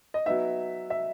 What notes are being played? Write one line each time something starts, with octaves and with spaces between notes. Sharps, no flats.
D#5
F#3 B3 D#4 E5
E5